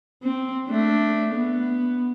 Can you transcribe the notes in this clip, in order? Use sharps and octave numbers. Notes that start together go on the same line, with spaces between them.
C4
A3 D4
B3